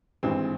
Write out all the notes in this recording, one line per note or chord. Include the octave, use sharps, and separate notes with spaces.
G#1 G2 E3 G#3 C4